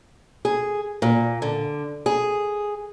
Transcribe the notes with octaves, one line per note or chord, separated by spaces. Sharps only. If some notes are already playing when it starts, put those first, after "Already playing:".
G#4
A#2
D3
G#4